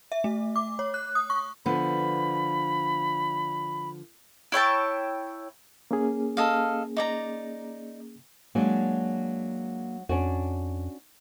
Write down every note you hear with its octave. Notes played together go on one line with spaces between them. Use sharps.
E5
A3
D6
C#5
F#6
D#6
C#6
D3 F3 B3 B5
E4 C#5 G5 A5
A#3 C#4 G#4
A4 D#5 F5
D#4 D5 A#5
F#3 G#3 A#3 D4
F2 C#4 D4 F#4